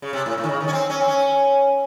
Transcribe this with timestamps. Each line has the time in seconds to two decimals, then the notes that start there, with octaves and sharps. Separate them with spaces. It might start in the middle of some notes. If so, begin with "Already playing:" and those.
0.02 C#3
0.13 C3
0.26 A2
0.38 A2
0.44 D#3
0.49 C#3
0.60 D#3
0.68 C#4
0.73 C4
0.90 C#4
1.01 C4
1.08 C#4